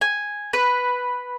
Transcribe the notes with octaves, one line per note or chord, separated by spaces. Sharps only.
G#5
B4